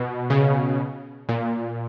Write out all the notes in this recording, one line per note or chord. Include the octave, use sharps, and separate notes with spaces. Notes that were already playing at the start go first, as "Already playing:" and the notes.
Already playing: B2
C#3
A#2